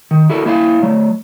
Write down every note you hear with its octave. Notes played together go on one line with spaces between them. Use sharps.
D#3
E4 F#4 A4 A#4
A#3 E4 E5 F5
F#3 A3